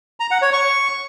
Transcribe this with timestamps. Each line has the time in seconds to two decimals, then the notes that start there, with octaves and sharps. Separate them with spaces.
0.20 A#5
0.31 F#5
0.42 C#5
0.53 C#6